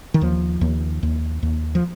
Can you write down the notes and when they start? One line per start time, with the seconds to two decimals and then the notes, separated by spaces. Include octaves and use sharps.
0.14 D#3
0.21 D#2 F3
0.61 D#2
1.03 D#2
1.43 D#2
1.75 F3